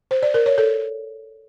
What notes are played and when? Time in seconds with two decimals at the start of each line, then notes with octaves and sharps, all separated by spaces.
0.11 C5
0.23 D5
0.34 A#4
0.46 C#5
0.58 A4